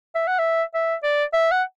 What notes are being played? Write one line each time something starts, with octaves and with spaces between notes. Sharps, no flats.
E5
F#5
E5
E5
D5
E5
F#5